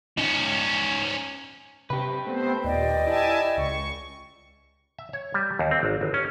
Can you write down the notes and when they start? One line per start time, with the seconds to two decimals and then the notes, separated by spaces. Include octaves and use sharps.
0.18 C#4 D#4
1.90 C3 G4 B4
2.26 A3 B3 C4 C5
2.64 D#2 A#2 D5 D#5 G5
3.07 E4 E5 G#5 A5
3.57 C#2 C#6
4.99 E5
5.13 C#5
5.34 G3
5.59 D#2
5.71 C4
5.83 G#1
6.01 G1
6.14 C#4